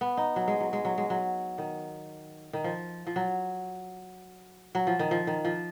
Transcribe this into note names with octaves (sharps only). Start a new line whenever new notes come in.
B3
D#4
F#3
G#3
F#3
G#3
F#3
G#3
F#3
D#3
D#3
F3
F3
F#3
F#3
F3
D#3
F3
D#3
F3